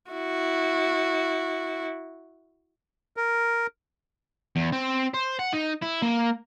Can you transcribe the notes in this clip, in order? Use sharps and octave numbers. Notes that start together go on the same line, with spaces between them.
E4 F#4
A#4
E2
C4
C5
F#5
D#4
E4
A#3